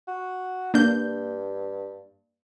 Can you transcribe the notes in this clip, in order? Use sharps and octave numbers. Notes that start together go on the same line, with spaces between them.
F#4
G2 A#3 D4 G6